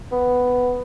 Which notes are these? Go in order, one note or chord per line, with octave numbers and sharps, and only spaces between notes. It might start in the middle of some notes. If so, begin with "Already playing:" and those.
B3